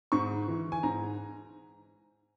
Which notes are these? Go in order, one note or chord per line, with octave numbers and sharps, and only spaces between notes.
G#2 C#6
E3
G#5
G#2 A#5